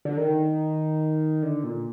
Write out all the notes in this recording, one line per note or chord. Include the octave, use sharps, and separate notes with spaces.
D3
D#3
D3
A#2